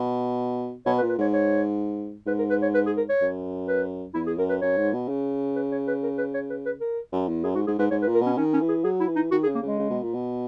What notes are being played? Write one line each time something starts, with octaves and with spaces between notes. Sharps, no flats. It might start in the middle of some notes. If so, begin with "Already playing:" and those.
Already playing: B2
B2 C#5
B4
A#2
B4
G#2 C#5
C#5
G#2 B4
A#4
B4
C#5
B4
G#4
A#4
C#5
F#2
B4
E2 E4
G#4
F#2 A#4
B4
F#2 C#5
G#2
B2
C#3
B4
C#5
B4
A#4
B4
C#5
B4
B4
A#4
F#2
E2
F#2 G#4
G#2 F#4
G#2 G#4
G#2 B4
G#2 C#5
B4
A#2
A#4
B2 C#4
D#3 C#4
C#4
E3
G#4
F#3 G#4
E4
E3
D#4
D#3 F#4
G#4
C#3
A#3
C#3
G#3
C#3
B2
A#2
B2